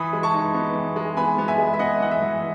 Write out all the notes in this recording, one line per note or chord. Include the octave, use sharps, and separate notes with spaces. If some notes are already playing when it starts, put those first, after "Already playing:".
Already playing: E3 B5 D#6
G#3
A5 C#6
D#4
B3
E3
G#3
B3 G#5 B5
B3
E5 G#5
G#3
E5
B3 D#5 F#5
E3 F#5
E5
E3